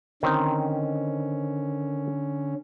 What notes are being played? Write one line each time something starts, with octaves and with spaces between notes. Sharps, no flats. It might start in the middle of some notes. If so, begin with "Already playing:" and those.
D3 D#3 C4 C#4 D#4